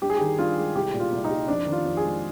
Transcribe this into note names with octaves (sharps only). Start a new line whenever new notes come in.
G2 G4
G#4
D#3 G4
G2 F4
G#3
C2 G4
A#2
F4
C2
D#4
G3
F2 D4
D#3
F4
F2
G#4
G#3